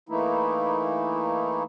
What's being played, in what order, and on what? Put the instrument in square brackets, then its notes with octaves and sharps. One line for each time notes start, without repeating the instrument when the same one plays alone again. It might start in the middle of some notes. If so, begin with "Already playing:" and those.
[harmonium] E3 A3 A#3 D#4 E4